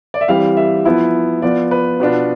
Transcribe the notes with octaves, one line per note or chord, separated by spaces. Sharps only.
D5
E5
E3 G3 C4 F5
E5
F3 B3 E4
F3 B3 F4 D5
B4
B2 B3 D4 F4 B4